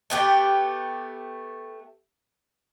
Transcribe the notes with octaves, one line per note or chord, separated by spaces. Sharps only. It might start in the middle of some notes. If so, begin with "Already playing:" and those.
A3 B3 G4